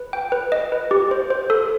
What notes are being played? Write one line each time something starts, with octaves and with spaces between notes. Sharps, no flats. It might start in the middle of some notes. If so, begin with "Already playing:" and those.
Already playing: B4
G5
B4
D#5
B4
G4
C5
C5
A4